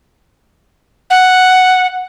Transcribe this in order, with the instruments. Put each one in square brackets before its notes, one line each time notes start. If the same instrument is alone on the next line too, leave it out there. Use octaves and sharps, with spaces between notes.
[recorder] F#5